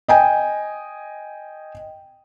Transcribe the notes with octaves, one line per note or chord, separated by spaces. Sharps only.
D#5 G5 G#5